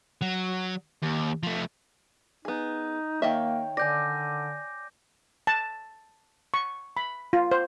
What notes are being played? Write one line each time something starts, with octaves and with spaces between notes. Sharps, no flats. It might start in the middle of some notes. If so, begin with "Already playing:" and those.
F#3
D#2
F3 A3
B3 D#4 G#4
D#3 A#3 C#5 D#5 E5 G5
D3 D5 G#5 G6 A#6
A5
C#6
B5
F4
C5